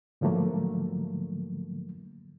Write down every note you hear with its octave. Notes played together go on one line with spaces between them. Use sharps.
G#2 D3 F3 F#3 A3 A#3